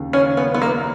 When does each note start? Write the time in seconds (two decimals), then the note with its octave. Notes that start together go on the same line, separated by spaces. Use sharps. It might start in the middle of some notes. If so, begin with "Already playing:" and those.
Already playing: D#2 C#3
0.13 C#4
0.37 B3
0.54 B3
0.62 A#3